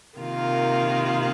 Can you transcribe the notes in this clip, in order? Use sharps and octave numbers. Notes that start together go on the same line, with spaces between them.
C3 D#3 A#3 F4